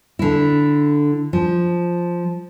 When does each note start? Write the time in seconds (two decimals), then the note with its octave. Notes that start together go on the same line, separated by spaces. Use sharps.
0.19 D3 E4
1.33 F3